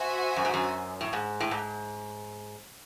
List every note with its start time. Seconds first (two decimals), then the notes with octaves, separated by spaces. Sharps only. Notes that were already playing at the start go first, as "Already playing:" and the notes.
Already playing: F#4 C5 E5 G#5
0.36 F#2
0.45 G#2
0.54 F#2
1.01 A2
1.13 G#2
1.40 A2
1.51 G#2